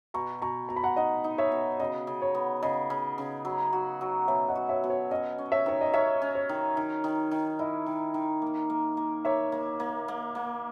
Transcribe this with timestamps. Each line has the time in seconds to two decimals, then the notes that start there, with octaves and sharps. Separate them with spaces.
0.14 B2 A#5 C#6
0.42 B2 A#5 C#6
0.69 B2 A#5
0.76 B5
0.83 F#5 A#5
0.96 D#4 D#5 F#5
1.24 D#4
1.38 C#5 E5
1.52 B2
1.80 C#3 D#5
2.07 C#3
2.22 C#5
2.35 B3
2.63 C#3 D#5
2.90 C#3
3.18 C#3
3.45 F#3
3.73 F#4
4.01 F#3
4.28 B2 C#5 E5
4.48 D#5 F#5
4.55 F#4
4.69 C#5 E5
4.84 B2
4.90 C#5
5.11 C#4 D#5
5.38 C#4
5.52 C#5 E5
5.66 D#3 C#5
5.81 D#5
5.94 C#4 C#5 E5
6.22 C#4
6.35 C#5
6.49 D#3
6.77 D#3
7.04 D#3
7.31 D#3
7.59 E4 D#5
7.86 D#3
8.14 D#3
8.42 A#3
8.70 A#3
8.97 A#3
9.25 A#3 C#5 E5
9.52 A#3
9.80 A#3
10.08 A#3
10.35 A#3